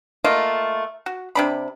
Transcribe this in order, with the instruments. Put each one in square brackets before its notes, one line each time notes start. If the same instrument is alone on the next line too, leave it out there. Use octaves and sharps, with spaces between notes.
[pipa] A3 A#3 F4 D#5
F#4
C3 D4 B5